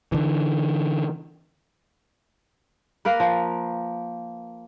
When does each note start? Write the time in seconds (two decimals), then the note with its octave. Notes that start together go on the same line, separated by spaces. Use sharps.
0.12 D3 E3
3.05 A#3 A#4 B4
3.20 F3